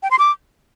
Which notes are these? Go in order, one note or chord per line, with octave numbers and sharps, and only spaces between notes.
G5
C6
D6